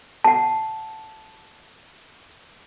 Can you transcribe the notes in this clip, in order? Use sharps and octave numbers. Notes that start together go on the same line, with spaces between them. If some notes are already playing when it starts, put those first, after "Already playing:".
F#5 A5